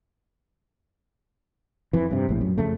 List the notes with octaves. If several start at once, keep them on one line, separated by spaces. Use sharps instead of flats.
F2 E3
G2 C3
A#1 A2
F#2
F2 C#3 A3